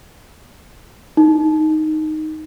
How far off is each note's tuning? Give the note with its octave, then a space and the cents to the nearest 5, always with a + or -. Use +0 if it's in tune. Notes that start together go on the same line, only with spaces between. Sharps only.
D#4 +0